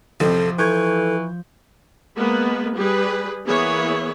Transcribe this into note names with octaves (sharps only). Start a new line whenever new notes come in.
A1 F2 C3 F3 A4
E3 A4 C#6 G6 G#6
G#3 A#3 B3 B4
G3 G4 G#4 B4
E3 A#3 B3 E4 G#4 C#5